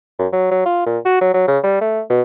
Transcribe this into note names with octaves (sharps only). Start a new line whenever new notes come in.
F#2
F#3
F#3
F4
A#2
F#4
F#3
F#3
C#3
G3
A3
B2